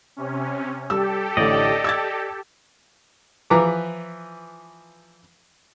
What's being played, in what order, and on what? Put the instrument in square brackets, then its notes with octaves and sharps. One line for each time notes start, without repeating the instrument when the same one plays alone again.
[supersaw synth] C3 C#4
[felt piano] G3 E6 [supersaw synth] G4 A4
[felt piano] A1 A2 D3 [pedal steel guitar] D5 D#5
[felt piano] E6 G#6 A6
[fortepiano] E3 F3 B4 A#5 D6